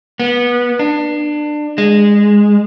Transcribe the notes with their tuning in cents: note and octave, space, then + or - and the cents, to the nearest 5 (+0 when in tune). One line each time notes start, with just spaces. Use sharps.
B3 -25
D4 +25
G#3 -10